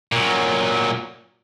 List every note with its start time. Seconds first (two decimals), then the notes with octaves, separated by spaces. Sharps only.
0.12 A#2 F#3